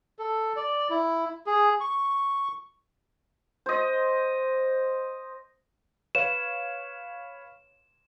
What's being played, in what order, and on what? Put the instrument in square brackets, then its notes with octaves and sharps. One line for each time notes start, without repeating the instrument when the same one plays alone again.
[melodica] A4
D5
E4
G#4
C#6
[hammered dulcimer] C5 D#5
[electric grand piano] B4 C#5 F5 [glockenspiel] E7